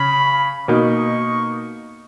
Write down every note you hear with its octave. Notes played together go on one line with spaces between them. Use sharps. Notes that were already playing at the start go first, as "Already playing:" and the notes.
Already playing: C#3 C#4 B5
B2 A#3 D#4 C#6